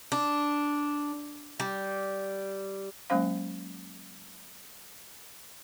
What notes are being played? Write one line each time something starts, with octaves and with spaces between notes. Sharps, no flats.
D4
G3
F#3 G#3 A#3 C#4 C5 F5